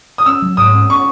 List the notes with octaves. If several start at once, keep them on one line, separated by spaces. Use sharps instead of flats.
D#6
C#4 E6
F#3
G#2 D#6
C#4
C#4 C#6